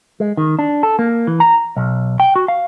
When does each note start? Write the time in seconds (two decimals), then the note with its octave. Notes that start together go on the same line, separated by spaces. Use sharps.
0.20 G#3
0.37 D#3
0.59 D4
0.83 A4
0.99 A#3
1.27 E3
1.40 A#5
1.77 B1
2.20 G5
2.36 F#4
2.48 F5